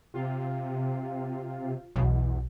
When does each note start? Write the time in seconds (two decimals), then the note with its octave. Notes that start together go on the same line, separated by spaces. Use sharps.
0.14 C3 F4
1.96 B1 E2 B2